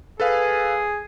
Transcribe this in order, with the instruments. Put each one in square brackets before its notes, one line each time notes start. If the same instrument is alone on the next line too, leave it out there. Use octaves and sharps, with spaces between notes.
[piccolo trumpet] G#4 [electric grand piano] A4 B4 F5